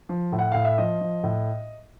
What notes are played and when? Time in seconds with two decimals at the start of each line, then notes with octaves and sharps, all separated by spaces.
0.09 F3
0.32 A2
0.39 F#5
0.52 A2 F5
0.65 E5
0.78 F3 D#5
1.01 F3
1.23 A2